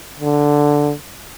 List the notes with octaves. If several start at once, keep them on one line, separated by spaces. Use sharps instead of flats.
D3